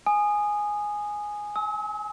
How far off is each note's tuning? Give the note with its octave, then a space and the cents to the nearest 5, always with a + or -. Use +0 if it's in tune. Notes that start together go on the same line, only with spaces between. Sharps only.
G#5 +0 D#6 -20
G#5 +40 E6 -45